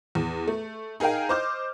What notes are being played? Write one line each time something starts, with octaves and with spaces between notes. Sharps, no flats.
E2
A3
D#4 G#4 A#4 F5 G5
C5 D#5 D6 F6 G6